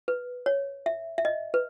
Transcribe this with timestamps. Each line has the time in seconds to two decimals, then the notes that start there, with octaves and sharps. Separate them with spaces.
0.08 B4
0.46 C#5
0.86 E5
1.18 E5
1.25 D#5
1.54 B4